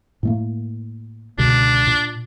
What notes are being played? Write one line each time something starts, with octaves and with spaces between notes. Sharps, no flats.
A2 A3 A#3
C#2 B2 D3 D4
A#2